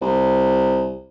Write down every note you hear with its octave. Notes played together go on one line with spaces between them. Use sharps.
C2